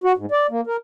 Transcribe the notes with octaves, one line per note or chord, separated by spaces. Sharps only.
F#4
G#2
D5
A#3
A#4